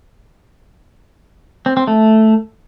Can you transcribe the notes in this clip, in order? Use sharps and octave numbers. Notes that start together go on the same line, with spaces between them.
C4
C4
A3